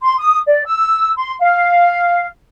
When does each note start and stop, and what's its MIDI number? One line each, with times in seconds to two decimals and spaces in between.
0.02 0.17 84
0.18 0.38 87
0.47 0.63 74
0.65 1.10 88
1.16 1.32 84
1.39 2.25 77